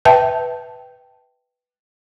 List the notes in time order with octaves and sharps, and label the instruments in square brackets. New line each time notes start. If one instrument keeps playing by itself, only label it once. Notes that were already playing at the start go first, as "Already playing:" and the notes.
[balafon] B4 E5 G5 A5